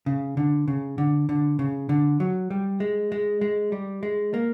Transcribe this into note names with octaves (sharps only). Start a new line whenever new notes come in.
C#3
D3
C#3
D3
D3
C#3
D3
F#3
G3
G#3
G#3
G#3
G3
G#3
A#3